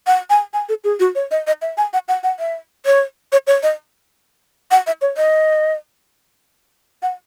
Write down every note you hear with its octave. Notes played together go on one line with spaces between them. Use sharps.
F#5
G#5
G#5
A4
G#4
F#4
C#5
D#5
D#5
E5
G#5
F#5
F#5
F#5
E5
C#5
C#5
C#5
D#5
F#5
E5
C#5
D#5
F#5